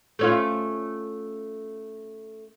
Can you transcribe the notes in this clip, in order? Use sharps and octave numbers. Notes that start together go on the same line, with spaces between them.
A3 C#4 F4